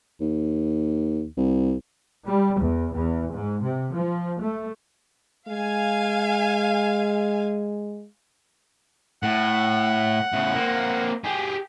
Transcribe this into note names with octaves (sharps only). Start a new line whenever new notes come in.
D#2
C2
G3
E2
E2
G#2
C3
F3
A3
G#3 F5 G#5
A2 F#5
A2 C#3
A#3 C4
G4 G#4